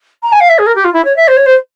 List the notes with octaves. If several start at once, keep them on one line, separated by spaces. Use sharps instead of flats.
A#5
G#5
F5
E5
G#4
A#4
G4
F4
E4
C#5
E5
C5
C#5
C5